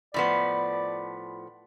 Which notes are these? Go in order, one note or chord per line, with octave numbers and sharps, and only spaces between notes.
A2 F3 B3 D5